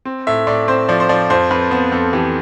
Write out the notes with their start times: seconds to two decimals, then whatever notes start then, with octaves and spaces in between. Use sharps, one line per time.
0.05 C4
0.27 A2 E5
0.47 A2 D5
0.68 C4 C5
0.89 F3 D5
1.00 C5
1.09 F3 D5
1.30 F2 C5
1.51 F2 B4
1.71 B3 C5
1.92 F2 A4
2.13 E3 G4